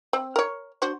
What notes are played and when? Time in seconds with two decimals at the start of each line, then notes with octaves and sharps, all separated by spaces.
0.13 C4
0.36 A#4 C#5
0.82 D4 F#4 C5